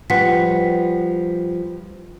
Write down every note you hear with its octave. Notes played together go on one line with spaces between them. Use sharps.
F3 G3 B4 F#5 B6